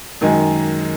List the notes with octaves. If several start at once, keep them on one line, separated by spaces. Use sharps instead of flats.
F#2 D#3 G#3 D#4 G#4